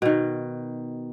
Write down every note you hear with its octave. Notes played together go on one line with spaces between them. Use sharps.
B2 D#3